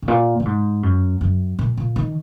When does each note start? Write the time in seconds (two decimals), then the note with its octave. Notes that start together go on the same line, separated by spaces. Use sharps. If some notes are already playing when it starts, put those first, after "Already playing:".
0.02 G#2
0.08 A#2
0.40 A#2
0.45 G#2
0.83 F#2
1.21 F#2
1.59 A#2
1.77 A#2
1.96 D#3